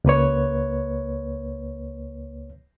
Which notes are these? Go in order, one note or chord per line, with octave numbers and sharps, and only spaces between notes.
C#2 A#3 B4 C#5